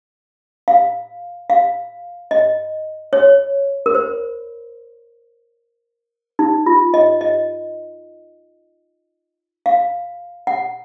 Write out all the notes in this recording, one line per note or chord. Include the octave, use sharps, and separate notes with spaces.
F5
F5
D#5
C#5
A#4
C5
D#4
F4
D#5
D#5
F5
F#5